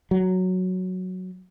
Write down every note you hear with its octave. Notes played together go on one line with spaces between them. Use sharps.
F#3